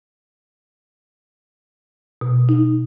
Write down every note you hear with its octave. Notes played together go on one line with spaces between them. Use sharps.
B2
D#4